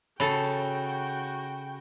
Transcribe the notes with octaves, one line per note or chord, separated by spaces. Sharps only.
C#3 F#4 A4 G5 B5